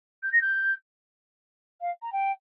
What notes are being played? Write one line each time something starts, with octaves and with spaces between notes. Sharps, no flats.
G6
A#6
G6
F5
A#5
G5